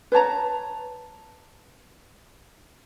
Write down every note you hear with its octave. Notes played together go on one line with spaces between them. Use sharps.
B4 C#5 A5 A#5